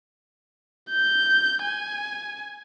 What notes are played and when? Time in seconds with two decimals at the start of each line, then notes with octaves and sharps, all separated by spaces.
0.90 G6
1.64 G#5